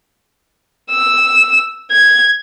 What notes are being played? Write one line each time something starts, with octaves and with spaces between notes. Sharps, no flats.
E6
G#6